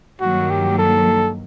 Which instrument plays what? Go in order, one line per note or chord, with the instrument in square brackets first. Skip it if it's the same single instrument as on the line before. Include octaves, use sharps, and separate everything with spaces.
[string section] G2 D#3 F#3 A#3 [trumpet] F#4
[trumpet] G4
A4